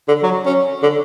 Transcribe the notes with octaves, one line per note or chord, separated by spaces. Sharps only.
D3
F#3
C#4
D3